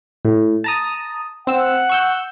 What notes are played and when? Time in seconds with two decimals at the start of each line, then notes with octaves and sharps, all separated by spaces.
0.25 A2
0.64 A5 A#5 D#6
1.47 C4 F#5 E6
1.90 C#6 E6 G6